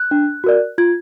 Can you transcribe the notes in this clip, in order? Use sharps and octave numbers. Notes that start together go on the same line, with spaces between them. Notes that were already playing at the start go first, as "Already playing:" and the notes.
Already playing: F#6
D4
F#4 A#4 D5
F4 G#6